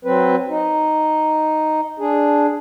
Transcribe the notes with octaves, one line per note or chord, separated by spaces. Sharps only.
F#3 C4 B4
D#4
D4 G#4